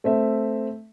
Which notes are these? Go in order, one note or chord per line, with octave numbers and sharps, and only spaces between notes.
A3 C4 E5